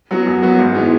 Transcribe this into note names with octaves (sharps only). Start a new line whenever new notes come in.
F#3 B3 F#4
F#2
F#3 B3 F#4
G#1
E3 G#3 B3